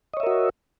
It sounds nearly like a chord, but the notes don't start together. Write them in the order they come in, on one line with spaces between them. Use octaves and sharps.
D#5 C#5 E5 A#4 F#4